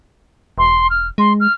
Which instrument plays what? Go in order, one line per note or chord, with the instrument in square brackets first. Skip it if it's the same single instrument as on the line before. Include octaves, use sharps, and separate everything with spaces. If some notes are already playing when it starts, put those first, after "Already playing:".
[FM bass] E1 [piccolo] C6
[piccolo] F6
[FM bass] G#3 [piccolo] C6
[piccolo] F6